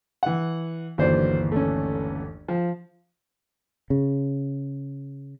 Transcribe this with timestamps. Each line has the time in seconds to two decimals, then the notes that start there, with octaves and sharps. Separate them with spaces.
0.23 E3 F#5
0.98 G1 D#2 E3 F#3 C5 D5
1.52 A3 C#4
2.48 F3
3.90 C#3